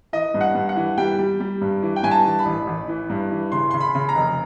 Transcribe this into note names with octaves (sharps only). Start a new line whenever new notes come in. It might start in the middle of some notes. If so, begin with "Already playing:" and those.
E3 D#5
G2
F#5
G2
F#5
E3
G3 G5
G3
G3
G2
E3
G5
G2 G#5
A5
E3
B5
A1
A1
E3
G2
E3
C#3 C6
C#3 C6
B5
C#3
A#5
F1